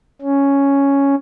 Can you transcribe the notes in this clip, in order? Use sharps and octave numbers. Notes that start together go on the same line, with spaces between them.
C#4